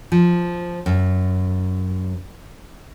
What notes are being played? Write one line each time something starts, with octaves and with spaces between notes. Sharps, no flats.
F3
F#2